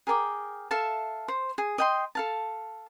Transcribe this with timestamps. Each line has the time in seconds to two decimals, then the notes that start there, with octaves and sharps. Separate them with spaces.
0.07 G#4 A#4 G5 D6
0.71 A4 E5 F5 A5
1.28 C5
1.58 G#4
1.78 D#5 G5 C6
2.15 A4 F5 A5